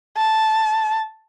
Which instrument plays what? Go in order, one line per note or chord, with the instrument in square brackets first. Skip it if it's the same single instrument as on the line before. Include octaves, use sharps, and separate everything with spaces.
[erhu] A5